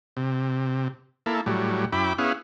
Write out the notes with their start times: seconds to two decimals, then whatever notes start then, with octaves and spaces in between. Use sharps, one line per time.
0.17 C3
1.26 A#3 E4 A4
1.46 A2 F#3 G3
1.92 F#2 E4 G5 B5 D6
2.18 B3 C#4 E4 G#4 F5 F#5